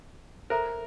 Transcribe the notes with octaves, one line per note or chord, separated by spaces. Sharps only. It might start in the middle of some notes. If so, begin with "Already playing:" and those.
A4 A#4 C5 E5 A#5